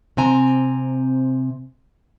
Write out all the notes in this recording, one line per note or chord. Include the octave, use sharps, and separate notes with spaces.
C3 C4 G#5 A#5